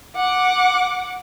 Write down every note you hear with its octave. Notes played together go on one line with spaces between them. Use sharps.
F#5 D6